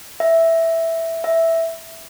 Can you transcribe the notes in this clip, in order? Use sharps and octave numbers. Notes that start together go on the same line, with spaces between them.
E5
E5